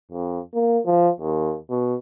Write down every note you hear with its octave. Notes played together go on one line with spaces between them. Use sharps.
F2
A#3
F3
D#2
B2